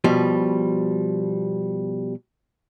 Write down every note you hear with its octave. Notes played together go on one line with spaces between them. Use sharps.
B2 F3 G3